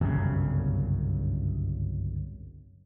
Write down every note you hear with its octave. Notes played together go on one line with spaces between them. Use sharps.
G1 C2 F#2 C#3